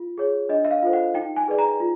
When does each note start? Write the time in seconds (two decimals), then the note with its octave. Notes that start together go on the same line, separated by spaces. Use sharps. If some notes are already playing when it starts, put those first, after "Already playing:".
Already playing: F4
0.18 G#4 C#5
0.49 D4 D#5
0.65 E5
0.71 F5
0.83 F4 A4 C5
0.93 F#5
1.14 D#4 G5
1.36 G#5
1.48 G#4 B4 D5
1.59 A#5
1.80 F4